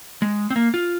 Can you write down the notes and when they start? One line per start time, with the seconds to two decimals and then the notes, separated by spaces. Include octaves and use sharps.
0.22 G#3
0.50 C4
0.56 A#3
0.74 F4